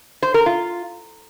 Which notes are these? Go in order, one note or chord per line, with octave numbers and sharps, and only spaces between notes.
C5
A#4
F4